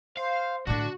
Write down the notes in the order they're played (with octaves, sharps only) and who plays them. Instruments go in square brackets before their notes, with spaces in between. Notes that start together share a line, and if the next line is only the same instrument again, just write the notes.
[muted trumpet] C5 [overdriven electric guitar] F5
[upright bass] A2 D3 [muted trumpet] D4 [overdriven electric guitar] F#4